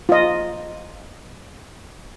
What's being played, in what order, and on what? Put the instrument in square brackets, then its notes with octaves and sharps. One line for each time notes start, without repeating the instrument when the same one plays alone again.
[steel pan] F4 D#5